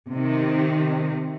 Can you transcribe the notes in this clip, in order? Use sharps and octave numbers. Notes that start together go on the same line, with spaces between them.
C3 D#3